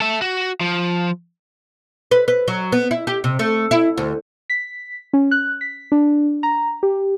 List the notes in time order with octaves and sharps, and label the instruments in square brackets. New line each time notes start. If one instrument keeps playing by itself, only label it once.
[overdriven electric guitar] A4 E5
F#4
F3
[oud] B4
B4
F#3
B3
E4
G4
C3
A3
E4
D2
[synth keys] B6
C#4
F#6
B6
D4
A#5
G4